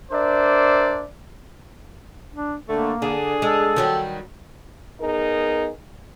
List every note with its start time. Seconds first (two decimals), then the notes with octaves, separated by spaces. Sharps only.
0.12 D4 A#4 C5 D5 E5
2.33 D4
2.69 D3 A3 A#3
3.02 D3 D4 G#4
3.42 G#3 A4
3.76 D#3 F#3 G3
5.01 B3 D#4 G#4 A#4